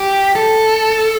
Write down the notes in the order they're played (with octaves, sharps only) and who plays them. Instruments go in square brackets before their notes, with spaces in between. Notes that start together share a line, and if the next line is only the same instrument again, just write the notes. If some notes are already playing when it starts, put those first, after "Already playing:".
Already playing: [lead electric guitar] G4
A4